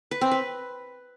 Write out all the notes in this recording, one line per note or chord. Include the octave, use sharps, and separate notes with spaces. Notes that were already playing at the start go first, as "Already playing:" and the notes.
B4
C4
B4